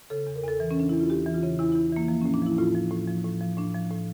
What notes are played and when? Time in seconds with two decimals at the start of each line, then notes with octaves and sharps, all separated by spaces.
0.10 C#3 A4
0.27 E2
0.36 A#4
0.43 E2 A4
0.60 E3
0.71 C#4
0.76 C#3 D4
0.89 E2 E4
1.00 F4
1.10 E2 G4
1.26 E3
1.34 F4
1.43 C#3
1.59 E2 E4
1.72 E4
1.76 E2
1.92 E3 A#3
2.08 F3 A#3
2.21 C#4
2.26 A2
2.34 D4
2.42 F3 E4
2.58 A2 F4
2.75 F3
2.91 A2
3.08 F3
3.25 A2
3.41 F3
3.57 A2 D4
3.75 F3
3.90 A2